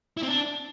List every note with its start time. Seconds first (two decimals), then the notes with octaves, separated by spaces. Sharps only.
0.17 E4
0.23 C4
0.28 D4